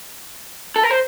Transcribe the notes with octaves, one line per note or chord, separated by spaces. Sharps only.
A4
A#4
C5